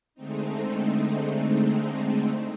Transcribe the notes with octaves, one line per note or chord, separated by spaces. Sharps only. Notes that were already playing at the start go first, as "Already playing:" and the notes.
D3 G#3 A3 C4 D#4